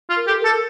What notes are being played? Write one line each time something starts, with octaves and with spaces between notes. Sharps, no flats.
F4
A#4
G4 A4
A#4
A4
A#4